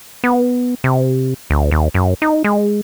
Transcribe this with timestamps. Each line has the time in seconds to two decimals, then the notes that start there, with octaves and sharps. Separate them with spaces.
0.24 B3
0.84 C3
1.50 D2
1.71 D#2
1.94 F#2
2.22 D#4
2.44 G#3